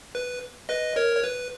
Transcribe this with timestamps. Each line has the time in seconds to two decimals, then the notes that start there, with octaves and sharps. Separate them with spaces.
0.15 B4
0.69 B4 D#5
0.96 A#4 C#5
1.17 C#5
1.24 B4